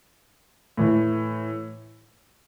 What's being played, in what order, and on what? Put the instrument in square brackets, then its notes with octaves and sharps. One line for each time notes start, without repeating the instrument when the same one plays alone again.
[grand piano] A2 E3 A3